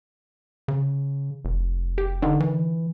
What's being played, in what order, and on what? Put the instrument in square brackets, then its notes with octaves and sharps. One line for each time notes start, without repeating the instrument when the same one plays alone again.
[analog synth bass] C#3
F1
[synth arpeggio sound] G4
D3 D#3
[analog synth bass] E3